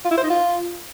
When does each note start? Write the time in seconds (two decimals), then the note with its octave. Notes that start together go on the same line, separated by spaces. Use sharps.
0.05 F4
0.11 E4
0.17 C5
0.23 D#4
0.30 F4